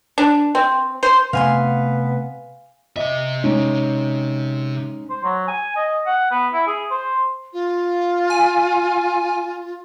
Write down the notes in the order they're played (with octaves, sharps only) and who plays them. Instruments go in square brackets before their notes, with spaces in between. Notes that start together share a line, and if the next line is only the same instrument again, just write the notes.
[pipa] D4
C4
C5
[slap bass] C3 A3 [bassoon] B3 [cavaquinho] F5 G#5 C6
[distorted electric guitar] C3 E5 [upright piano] D#5
[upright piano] G#3 C#4 D#4
[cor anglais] C5
F#3
G#5
D#5
F#5
B3
E4
G#4
C5
[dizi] F4
[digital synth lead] G#5